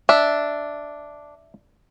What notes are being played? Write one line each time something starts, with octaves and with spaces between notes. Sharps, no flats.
D4 E5